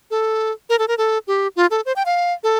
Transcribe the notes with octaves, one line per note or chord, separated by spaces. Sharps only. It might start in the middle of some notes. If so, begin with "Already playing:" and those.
A4
A#4
A4
A#4
A4
G4
F4
A4
C5
G5
F5
A4